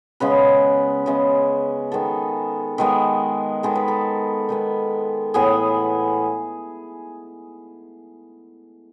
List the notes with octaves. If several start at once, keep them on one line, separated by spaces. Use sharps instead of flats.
C#3 G#3 B3 B4
C#3 G#3 B3
D#3 G#3 B3 A4
D#3 G#3 B3
D#3 G#3 B3 A4
B4
A4
D#3 G#3 B3
A2 E3 B3 G#4